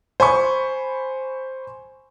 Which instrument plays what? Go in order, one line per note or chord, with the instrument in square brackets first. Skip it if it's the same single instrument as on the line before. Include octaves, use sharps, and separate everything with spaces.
[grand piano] C5 G#5 B5 C#6